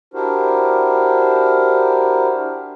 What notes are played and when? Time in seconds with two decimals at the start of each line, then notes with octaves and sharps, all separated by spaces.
0.14 D4 E4 F#4 G4 A#4 C5